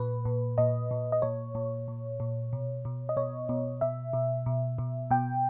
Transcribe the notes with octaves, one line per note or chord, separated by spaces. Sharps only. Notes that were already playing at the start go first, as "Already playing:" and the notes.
Already playing: A#2 B4
A#2
A#2 D#5
A#2
D#5
A#2 C#5
A#2
A#2
A#2
B2
B2
D#5
B2 C#5
B2
B2 E5
B2
B2
B2
B2 G5